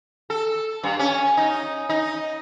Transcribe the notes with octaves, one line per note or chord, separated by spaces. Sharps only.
A4
G2
C#4
D#4
D#4